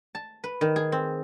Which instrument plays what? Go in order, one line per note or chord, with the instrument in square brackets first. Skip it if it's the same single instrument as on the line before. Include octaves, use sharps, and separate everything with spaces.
[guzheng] A5
B4
D#3
G#4
C4